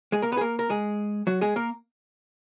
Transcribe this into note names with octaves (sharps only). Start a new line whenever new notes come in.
G#3 G#4
A#3 A#4
B3 B4
G#4
A#3 A#4
A#4
G#3 G#4
F#3 F#4
G#3 G#4
A#3 A#4